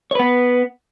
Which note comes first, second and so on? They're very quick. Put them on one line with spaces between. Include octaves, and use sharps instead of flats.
C#5 B4 B3